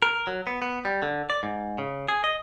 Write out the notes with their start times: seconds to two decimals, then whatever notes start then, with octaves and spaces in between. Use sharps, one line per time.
0.02 A#4
0.27 F#3
0.47 B3
0.62 B3
0.85 G3
1.02 D3
1.30 D5
1.43 G#2
1.78 C#3
2.09 G#4
2.24 D#5